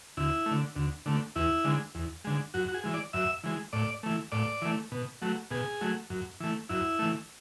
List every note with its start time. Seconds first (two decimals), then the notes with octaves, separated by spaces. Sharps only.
0.17 D2 E4
0.46 A3
0.51 D3
0.76 D2
1.06 D3 A3
1.36 E2 E4
1.65 D3 G#3
1.95 E2
2.25 D3 G#3
2.54 F#2 F#4
2.69 F#4
2.74 G#4
2.84 E3 G#3
2.94 D5
3.13 F#2 E5
3.44 E3 G#3
3.73 A2 D5
4.03 E3 A3
4.32 A2 D5
4.62 E3 A3
4.92 B2
5.22 F#3 A3
5.51 B2 G#4
5.81 F#3 A3
6.10 F#2
6.40 E3 A3
6.69 F#2 E4
6.99 E3 A3